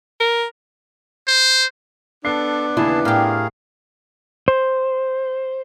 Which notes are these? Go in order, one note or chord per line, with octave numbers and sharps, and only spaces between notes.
A#4
C5
B3 D4 A4 C7
D#2 C#3 E3 E4 G#4 A5
A2 G4 G#4 A#4 F5
C5